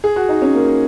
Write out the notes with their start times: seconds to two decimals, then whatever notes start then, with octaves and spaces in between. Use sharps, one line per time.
0.04 G#4
0.16 F#4
0.29 D#4
0.42 C#4
0.54 A#3